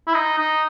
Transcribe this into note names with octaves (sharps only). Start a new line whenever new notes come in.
E4
D#4
D#4